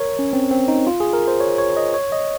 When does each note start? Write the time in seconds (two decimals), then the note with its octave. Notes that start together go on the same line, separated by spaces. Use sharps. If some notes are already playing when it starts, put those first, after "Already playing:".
Already playing: A#4 C#5
0.19 C#4
0.33 C4
0.51 C4
0.68 D#4
0.87 F4
1.00 G#4
1.13 A#4
1.28 C5
1.40 C#5
1.58 C#5
1.77 D#5
1.94 C#5
2.12 D#5